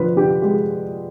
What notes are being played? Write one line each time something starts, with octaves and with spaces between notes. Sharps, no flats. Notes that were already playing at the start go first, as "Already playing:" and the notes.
Already playing: D3 F3 B4
D3 G4
G#3 G4